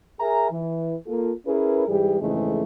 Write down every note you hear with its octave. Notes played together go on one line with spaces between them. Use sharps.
G#4 A#4 E5 G#5 A#5
E3
A#3 F4 A4
C#4 E4 G#4 A#4 B4
G#2 E3 G3 G4 G#4
F2 G#2 C#3 E3 G#3 A3